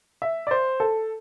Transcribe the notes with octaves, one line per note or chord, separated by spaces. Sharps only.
E5
D5
C5
A4